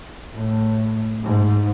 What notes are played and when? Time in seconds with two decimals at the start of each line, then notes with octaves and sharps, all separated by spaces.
0.34 A2
1.24 G#2